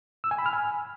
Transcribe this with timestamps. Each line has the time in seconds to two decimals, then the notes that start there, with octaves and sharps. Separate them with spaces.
0.24 E6
0.31 G#5
0.38 B5
0.46 F6
0.53 G#5